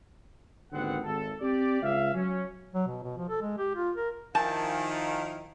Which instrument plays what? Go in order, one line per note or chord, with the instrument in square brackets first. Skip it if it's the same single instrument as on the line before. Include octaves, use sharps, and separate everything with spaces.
[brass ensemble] G#1 D#2 D3 B3 C4 F#5
G#1 A4
C4 G4 D5
C#2 E5 F5
F#3 C#4
[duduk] F#3
B2
B2
F3
A4
G#3
G4
F4
A#4
[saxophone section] D#3 [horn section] F3 E4 F5 [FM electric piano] G#5 G6 A6 [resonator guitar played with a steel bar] A5